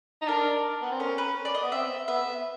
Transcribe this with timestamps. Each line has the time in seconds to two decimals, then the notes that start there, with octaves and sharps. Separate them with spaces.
0.22 D#4
0.28 D4 A#4
0.82 B3
0.91 C4
1.00 C#4 A#4
1.18 B4
1.45 D5
1.55 D#5
1.62 B3
1.72 C4 E5
2.08 B3 E5